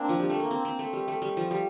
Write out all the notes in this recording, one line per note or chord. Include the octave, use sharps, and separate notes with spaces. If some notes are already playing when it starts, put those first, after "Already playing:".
Already playing: A#3 C4 D4
F3
G3
A3
A#3
C4
C4
A3
G3
A3
G3
F3
G3